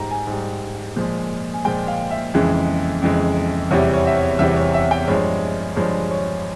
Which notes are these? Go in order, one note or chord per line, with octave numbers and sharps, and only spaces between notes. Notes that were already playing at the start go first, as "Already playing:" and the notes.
Already playing: G#2 G3 A#5
G#5
G#2 G3
A#2 F3 G#3
G#5
A#2 F3 G#3 G5
F5
E5
F2 C#3 E3 G#3
F2 C#3 E3 G#3
E2 C3 E3 G3 C#5
C#5
E5
C#5
E2 C3 E3 G3 E5
C#5
E5
G5
G2 F3 G#3 C#5
G2 F3 G#3 C#5
C#5